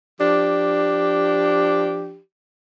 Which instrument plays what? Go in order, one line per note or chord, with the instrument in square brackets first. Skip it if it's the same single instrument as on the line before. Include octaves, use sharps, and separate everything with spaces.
[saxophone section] F3 D4 G4